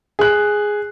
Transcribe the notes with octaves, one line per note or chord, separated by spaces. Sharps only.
G#4 F#6